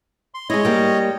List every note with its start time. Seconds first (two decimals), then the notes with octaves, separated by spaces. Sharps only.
0.34 C6
0.50 G#3 E4 C#5 D#5
0.65 G3 A#3